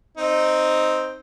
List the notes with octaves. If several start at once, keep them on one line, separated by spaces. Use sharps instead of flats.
C4 D#4